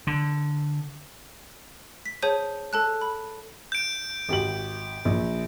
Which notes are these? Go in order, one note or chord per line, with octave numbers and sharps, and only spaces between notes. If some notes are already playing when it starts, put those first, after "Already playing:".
D3
B6
G#4 C5 C#5 A5 G6 D#7
A4 A5 F#6
B5
G6 D7
G#1 G4 F#7
A#1